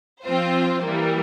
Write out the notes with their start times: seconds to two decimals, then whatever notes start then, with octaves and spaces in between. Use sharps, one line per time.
0.24 F3 C4 F4 C5
0.83 E3 G3 A#3